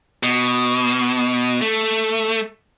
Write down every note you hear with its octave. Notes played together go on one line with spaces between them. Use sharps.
B2
A3